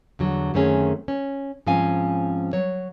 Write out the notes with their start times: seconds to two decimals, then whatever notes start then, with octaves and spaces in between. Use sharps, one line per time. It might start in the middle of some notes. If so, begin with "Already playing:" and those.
0.19 E2 D3 F#3
0.54 F#2 D#3 A3 C4 C#4 G#4
1.08 C#4
1.66 G#2 F3 C4 C#4 F5 G#5
2.53 F#3 C#5